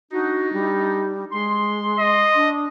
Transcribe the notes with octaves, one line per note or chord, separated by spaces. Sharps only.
D4 D#4 F#4
G3
G#3 C6
D#5
D4